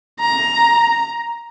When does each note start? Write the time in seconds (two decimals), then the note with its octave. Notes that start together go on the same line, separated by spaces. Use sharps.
0.20 A#5